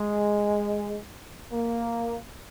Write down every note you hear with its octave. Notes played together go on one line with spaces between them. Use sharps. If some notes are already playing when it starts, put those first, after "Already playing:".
Already playing: G#3
A#3